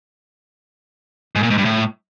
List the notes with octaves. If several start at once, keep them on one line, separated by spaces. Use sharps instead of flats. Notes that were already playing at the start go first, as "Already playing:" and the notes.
G#2
A#2
G#2
G2
A2